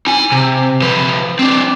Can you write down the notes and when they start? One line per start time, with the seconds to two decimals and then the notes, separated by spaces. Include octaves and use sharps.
0.07 D#4 G#5
0.32 C3
0.82 F3 B4
1.39 C4 D4